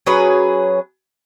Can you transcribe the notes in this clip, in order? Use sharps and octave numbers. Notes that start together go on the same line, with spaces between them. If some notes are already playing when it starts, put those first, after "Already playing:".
F#3 C#4 G#4 B4